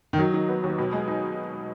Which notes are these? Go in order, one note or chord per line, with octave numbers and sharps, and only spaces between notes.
D#3
F#3 D#4
D#3
B3
D#2
B2
G#3
D#4